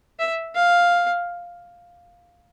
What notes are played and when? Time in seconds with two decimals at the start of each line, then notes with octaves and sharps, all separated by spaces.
0.19 E5
0.55 F5